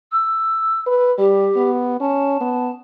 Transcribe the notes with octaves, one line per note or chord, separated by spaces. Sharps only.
E6
B4
G3 G4
B3
C#4 A5
B3